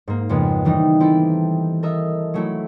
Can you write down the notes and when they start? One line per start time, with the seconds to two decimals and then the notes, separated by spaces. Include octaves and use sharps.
0.08 G#2 A#3
0.29 F2 C#3 G#3 B3
0.65 D#3 E3 G3 D#4
1.00 C4 E4 G4 A4
1.83 A4 A#4 D#5 E5
2.34 F#3 A3 E4